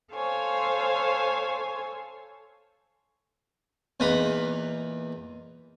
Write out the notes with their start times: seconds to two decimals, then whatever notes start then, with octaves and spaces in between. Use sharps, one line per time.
0.13 A4 C5 C#5 F5 G#5
4.00 E2 A#2 D#4 B4 A#5 B5